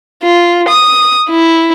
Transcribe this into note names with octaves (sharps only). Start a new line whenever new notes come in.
F4
D#6
E4